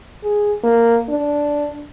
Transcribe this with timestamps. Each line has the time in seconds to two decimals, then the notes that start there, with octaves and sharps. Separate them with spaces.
0.23 G#4
0.64 A#3
1.09 D4